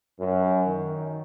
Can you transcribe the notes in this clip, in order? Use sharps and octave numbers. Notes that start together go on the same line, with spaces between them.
F#2
D#3